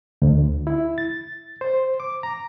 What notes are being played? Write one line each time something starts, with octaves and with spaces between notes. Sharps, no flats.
D2
E4
A6
C5
D6
A#5